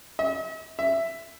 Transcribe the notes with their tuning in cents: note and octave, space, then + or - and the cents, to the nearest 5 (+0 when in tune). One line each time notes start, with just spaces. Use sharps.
E5 -45
E5 +10